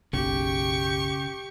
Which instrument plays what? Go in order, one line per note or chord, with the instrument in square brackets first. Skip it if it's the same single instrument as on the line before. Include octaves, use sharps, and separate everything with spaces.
[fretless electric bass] F#1 B1 [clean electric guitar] C#3 [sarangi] G4 [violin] C#6